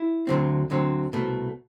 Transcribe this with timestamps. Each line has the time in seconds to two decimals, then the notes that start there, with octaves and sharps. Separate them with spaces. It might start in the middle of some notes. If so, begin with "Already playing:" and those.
Already playing: E4
0.27 D2 D3 F#3 C4
0.70 D2 D3 F#3 C4
1.13 C2 B2 A3